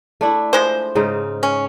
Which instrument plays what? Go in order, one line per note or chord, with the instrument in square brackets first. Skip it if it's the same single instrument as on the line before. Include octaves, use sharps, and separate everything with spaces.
[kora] A3 D4 E4
[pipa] F3 G#3 C5
[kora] G#2 C#3 D#4
[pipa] C#4